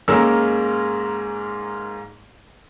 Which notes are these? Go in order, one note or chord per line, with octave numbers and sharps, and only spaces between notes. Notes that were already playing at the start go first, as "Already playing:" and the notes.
G#2 G#3 A#3 C#4 A#4 E6